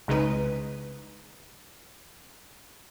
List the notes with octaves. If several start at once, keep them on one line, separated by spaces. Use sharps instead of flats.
C2 C#3 G#3 D#4 B4 D#7